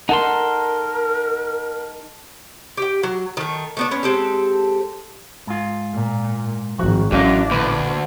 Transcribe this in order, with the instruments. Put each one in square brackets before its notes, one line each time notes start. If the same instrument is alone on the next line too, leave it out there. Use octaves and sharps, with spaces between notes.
[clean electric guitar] D#4 A4 C6 [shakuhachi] A#4 [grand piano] F#5
[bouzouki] G4 G5
F#3
D#3 A3
A3 B3 D4
B3 C#4
G#3 C4 G4 A4
[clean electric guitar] G#2 F4
[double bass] A#2
[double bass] G#1 [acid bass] F3 [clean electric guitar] F#4
[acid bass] A1 [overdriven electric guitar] F#2 [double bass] D4 [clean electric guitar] F#4 D#5 F5
[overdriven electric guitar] D2 [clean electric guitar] A#2 B4